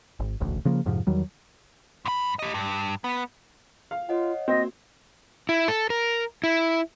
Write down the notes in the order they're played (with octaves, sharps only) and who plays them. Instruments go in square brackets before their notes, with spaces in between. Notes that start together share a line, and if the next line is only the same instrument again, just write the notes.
[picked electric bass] G#1
E1 A1 D2
C#3 F3 A#3
F2 G#2 C3 F3
E2 D#3 F#3 G3
[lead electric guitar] G2 B5
G4 D#5
G2
B3
[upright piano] F5
[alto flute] F4 [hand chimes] C#5 D#5 F#5
[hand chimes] A#3 F#4 [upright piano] C4 [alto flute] D#5
[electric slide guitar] E4
A4
A#4
E4